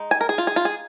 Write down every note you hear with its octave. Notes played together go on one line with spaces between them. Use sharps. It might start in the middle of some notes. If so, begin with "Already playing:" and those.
Already playing: G#3 D#4
G#5
A#4
G#4
F4
G#4
F4
G#4